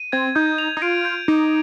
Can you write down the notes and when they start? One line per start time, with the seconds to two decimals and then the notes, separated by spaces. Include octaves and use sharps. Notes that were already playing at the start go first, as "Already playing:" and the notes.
Already playing: D#7
0.12 C4 G#6
0.35 D#4 G6
0.58 F7
0.77 D#4
0.82 F4 D7
1.05 G6
1.28 D#4 D6